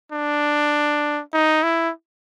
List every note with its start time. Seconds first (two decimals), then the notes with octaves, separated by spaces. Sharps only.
0.12 D4
1.33 D#4
1.63 E4